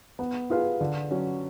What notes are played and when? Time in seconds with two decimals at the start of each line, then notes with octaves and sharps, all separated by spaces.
0.19 B3
0.50 F4 G#4 B4 F5
0.81 D3
1.11 F#3 C#4